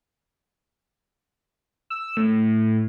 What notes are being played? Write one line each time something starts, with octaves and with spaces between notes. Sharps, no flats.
E6
A2